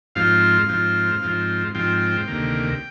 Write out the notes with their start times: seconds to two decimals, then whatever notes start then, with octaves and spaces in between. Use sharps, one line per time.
0.15 G#2 F3 C4 F4 F5
0.69 G#2 F3 C4 F4
1.22 G#2 F3 C4 F4
1.75 G#2 F3 C4 F4 G5
2.01 G5
2.28 D2 C3 D#3 A#3